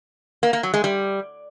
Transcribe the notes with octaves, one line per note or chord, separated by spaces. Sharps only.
A#3
A#3
F#3
G#3
G3